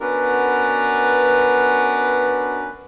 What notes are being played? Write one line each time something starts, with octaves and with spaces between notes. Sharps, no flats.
B3 C#4 D4 F#4 A#4 B4